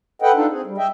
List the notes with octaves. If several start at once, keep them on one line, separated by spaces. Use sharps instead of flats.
A4 B4 D#5 F#5 G5
D4 D#4 F4 A4
C4 G#4
G3
D#5 E5 G5